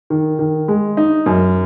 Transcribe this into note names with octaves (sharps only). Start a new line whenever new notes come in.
D#3
D#3
G#3
D#4
F#2